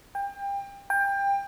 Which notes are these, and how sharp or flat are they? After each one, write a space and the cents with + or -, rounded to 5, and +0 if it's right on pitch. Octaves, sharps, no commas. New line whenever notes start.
G5 +30
G5 +25